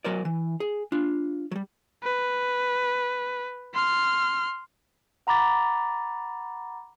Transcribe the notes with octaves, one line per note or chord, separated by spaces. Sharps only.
F#3 A#4 C5 D5
E3
G#4
D4 F4
F#3 G3
B4
C6 F6
F#5 A#5 B5 D6 A6